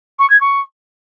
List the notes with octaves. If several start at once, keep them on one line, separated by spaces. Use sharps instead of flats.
C#6
G#6
C#6